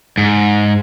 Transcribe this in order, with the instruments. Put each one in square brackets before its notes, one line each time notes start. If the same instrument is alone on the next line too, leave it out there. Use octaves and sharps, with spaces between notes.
[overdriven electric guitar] G#2